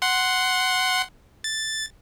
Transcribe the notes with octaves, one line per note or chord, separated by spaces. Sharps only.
F#5 C6
A6